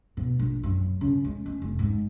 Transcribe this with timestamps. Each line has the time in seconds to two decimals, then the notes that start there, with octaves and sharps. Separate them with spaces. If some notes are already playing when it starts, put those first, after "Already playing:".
0.17 B2
0.39 A#1
0.63 F#2
1.01 C#3
1.25 G#3
1.46 C#4
1.62 F1
1.79 G#2